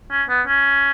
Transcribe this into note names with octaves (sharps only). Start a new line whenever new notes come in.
C#4
B3
C#4